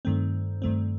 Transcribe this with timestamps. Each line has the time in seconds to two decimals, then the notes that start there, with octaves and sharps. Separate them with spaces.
0.05 G2 D#3 A3 C4
0.62 G2 D#3 A3 C4